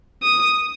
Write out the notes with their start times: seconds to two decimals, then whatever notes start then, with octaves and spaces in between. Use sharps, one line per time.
0.23 D#6